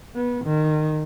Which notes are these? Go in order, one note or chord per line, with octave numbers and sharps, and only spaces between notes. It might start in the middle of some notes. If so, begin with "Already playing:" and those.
B3
D#3